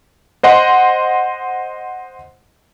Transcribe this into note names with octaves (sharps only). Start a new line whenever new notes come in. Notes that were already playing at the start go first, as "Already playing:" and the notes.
C5 D#5 F#5 C6